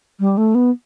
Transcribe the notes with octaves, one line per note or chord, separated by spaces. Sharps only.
G3
A3
B3